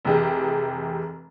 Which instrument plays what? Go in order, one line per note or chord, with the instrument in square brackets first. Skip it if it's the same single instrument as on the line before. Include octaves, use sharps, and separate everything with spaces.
[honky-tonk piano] F1 E3 G4 G#4